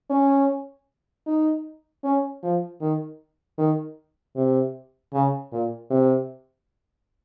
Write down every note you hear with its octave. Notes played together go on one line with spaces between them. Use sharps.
C#4
D#4
C#4
F3
D#3
D#3
C3
C#3
A#2
C3